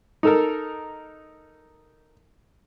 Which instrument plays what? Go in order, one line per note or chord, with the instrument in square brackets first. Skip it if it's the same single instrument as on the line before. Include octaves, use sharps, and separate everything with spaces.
[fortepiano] D#4 A4 A#4